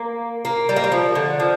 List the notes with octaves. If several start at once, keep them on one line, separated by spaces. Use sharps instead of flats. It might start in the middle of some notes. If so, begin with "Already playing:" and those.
Already playing: A#3
A#3
G3
A#3
G3
F3
D3
F3